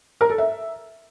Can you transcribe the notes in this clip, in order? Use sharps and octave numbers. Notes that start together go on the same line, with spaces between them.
A#4
A4
E5